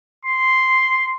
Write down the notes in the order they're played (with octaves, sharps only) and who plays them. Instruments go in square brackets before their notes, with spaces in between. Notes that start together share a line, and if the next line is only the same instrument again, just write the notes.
[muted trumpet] C6